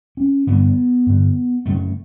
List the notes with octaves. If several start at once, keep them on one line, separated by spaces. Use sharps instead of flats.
C#4
G2 D3 B3
G2 D3
F#2 C#3 A3